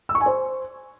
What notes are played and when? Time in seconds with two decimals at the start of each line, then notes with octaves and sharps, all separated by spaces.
0.09 E6
0.15 C#6
0.20 G#5
0.26 C5